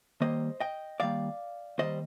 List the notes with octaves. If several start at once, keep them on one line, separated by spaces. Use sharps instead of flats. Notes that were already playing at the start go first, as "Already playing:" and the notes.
D#2 D#3 G3 A#3 C5 D#5
D#5 G5
D#2 D#3 G3 A#3 D5 F5
D#2 D#3 G3 C5 D#5